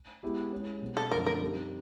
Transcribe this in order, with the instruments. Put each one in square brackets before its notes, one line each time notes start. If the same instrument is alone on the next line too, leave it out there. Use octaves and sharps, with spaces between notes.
[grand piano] G#3 B3 E4 G4
G#3 C#4 E4 G#4
B2 G3 C4
[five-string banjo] A4
[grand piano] F#2 D3 F3 A3 C4 [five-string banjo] A#4
[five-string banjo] A#4
[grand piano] G3 C4 D#4